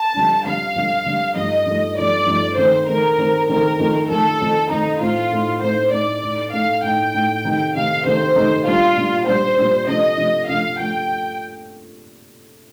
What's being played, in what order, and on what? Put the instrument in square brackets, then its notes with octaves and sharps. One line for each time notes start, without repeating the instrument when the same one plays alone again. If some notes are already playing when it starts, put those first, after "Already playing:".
Already playing: [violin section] A5
[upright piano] F2 D3 G3 D4
[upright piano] F2 D3 G3 D4 [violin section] F5
[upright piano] F2 D3 G3 D4
F2 D3 G3 D4
[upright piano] G2 F3 A3 D#4 [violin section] D#5
[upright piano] G2 F3 A3 D#4
[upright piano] G2 F3 A3 D#4 [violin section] D5
[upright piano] G2 F3 A3 D#4
[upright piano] D#3 A3 C4 [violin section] C5
[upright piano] D#3 A3 C4 [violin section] A#4
[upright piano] D#3 A3 C4
[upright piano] D#3 A3 C4 [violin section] A#4
[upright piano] F2 D#3 A3
[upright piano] F2 D#3 A3 [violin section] A4
[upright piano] F2 D#3 A3
[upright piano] F2 D#3 A3 [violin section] D#4
[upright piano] A2 A3 C4 D#4 [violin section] F4
[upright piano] A2 A3 C4 D#4
[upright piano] A2 A3 C4 D#4 [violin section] C5
[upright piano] A2 A3 C4 D#4 [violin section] D5
[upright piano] A2 A3 D#4
[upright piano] A2 A3 D#4 [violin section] F5
[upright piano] A2 A3 D#4 [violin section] G5
[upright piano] A2 A3 D#4
C3 D#3 A3 D#4
[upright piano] C3 D#3 A3 D#4 [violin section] F5
[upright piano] C3 D#3 A3 D#4 [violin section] C5
[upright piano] C3 D#3 A3 D#4
[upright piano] A#2 G3 D4 [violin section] F4
[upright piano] A#2 G3 D4
[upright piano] A#2 G3 D4 [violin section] C5
[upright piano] A#2 G3 D4
[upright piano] C3 F3 A3 D4 [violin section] D#5
[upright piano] C3 F3 A3 D4
[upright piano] C3 F3 A3 D4 [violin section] F5
[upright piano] C3 F3 A3 D4 [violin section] G5